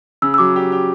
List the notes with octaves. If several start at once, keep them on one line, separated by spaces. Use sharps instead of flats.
C#3 E6
E6
F#3 D6
G4
G4